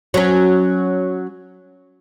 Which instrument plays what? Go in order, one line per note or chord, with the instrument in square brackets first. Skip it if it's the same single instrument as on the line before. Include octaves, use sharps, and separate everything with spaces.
[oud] F#3 C#4